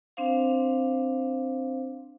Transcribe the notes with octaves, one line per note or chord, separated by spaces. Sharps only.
C4 D4 C5 F5